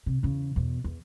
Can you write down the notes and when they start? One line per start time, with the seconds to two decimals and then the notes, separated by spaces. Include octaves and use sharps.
0.06 C3
0.23 E2 C#3
0.56 E2 B2
0.84 E2